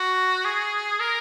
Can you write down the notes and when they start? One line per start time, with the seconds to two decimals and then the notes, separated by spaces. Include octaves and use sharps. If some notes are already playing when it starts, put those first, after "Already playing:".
Already playing: F#4
0.45 G#4
1.00 A#4